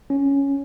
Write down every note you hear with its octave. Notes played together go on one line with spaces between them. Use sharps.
C#4